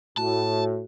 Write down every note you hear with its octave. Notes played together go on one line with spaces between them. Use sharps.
A2 F#4 A5